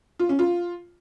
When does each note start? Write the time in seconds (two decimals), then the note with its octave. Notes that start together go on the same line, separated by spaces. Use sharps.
0.19 F4
0.29 C#4
0.39 F4